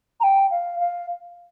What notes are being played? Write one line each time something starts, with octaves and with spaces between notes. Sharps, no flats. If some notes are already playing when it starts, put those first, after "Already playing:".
A#5
G5
F5
F5